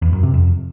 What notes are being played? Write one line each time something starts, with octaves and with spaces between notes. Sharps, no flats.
E2
F#2
C3
F2